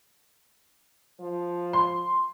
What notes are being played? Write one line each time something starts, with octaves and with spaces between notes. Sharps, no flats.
F3
C6